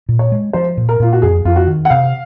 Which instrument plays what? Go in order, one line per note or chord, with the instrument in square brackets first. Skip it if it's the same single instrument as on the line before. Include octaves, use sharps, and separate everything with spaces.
[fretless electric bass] A#2
[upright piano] C#5
[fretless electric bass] G#3
[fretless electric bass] F3 [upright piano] C5
[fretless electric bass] A#2
[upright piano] A#4
[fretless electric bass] A#2 [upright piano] F4
[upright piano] F#4
[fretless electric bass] F2 [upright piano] G#4
[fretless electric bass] F2 [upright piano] F4
[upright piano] F#4
[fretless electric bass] D#3
[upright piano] F#5
[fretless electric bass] C3 [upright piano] F5